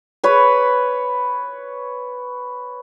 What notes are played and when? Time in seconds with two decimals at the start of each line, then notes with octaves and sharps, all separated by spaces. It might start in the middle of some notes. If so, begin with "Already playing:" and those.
0.24 B4 C#5 B5